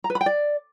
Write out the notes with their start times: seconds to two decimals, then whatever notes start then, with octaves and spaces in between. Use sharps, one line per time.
0.04 A#5
0.10 B4
0.15 B5
0.21 G5
0.26 D5